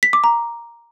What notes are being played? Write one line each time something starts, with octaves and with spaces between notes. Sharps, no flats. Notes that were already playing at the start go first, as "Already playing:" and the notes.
B6
D6
A#5